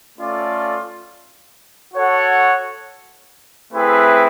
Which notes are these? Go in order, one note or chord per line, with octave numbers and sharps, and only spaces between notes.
A3 C#4 F4 A4 D5
F#4 A4 C#5 F#5
A3 C4 E4 G#4 B4